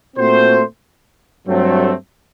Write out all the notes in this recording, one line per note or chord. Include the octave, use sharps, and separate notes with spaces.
A#2 A3 C4 F#4 C5
G2 F#3 A3 C4